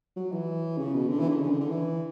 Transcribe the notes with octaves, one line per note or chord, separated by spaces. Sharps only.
F#3
E3
C#3
B2
D3
E3
D3
C#3
D3
D3
E3